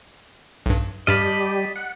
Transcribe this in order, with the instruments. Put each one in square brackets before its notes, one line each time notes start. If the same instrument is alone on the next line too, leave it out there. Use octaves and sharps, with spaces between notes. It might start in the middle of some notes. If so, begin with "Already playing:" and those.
[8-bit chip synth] B1 G2
[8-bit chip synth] G2 F6 [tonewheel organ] G3 G4 [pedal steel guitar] D#5 A5 B5
[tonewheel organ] F#5